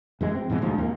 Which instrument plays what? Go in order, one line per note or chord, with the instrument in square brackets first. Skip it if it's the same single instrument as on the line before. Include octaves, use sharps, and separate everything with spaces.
[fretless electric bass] F#2 E3 G#3
C4
G#2 B2 E3 G#3
E1 D2 G#2 F3
D#2 A#3